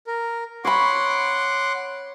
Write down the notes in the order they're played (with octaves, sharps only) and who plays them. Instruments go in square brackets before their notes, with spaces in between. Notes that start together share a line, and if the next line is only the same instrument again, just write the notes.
[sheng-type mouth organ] A#4
[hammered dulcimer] C#5 B5 [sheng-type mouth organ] F#5 C6 D6